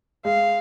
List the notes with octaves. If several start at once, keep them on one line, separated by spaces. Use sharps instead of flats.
G#3 F5